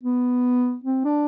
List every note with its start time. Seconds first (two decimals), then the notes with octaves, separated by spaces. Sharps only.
0.03 B3
0.84 C4
1.05 D4